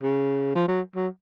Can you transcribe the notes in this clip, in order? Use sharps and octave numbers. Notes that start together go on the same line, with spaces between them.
C#3
F3
F#3
F#3